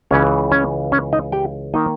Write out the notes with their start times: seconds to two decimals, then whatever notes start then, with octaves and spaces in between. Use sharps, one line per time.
0.11 C#2 C#3 E3 C#4 C#5
0.52 C#4 C#5
0.92 C#4 C#5
1.13 D#4 D#5
1.32 G4 G5
1.74 D#3 A#3 D#4 D#5